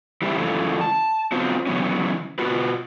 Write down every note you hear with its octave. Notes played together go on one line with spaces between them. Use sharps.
E3 G3 A#3 C4 E4
F#2 C#3 E3 A3 F4
A5
F#3 B3 C4 F4
C#3 E3 F#3 B3 C#4
B2 B3 F4 F#4 B4